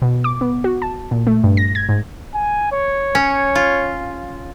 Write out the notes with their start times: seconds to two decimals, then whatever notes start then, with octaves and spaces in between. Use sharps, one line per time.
0.02 B2
0.24 D6
0.41 B3
0.64 F#4
0.82 A5
1.11 A#2
1.27 A3
1.44 G2
1.57 A#6
1.75 G#6
1.89 G#2
2.34 G#5
2.73 C#5
3.15 C#4
3.55 F4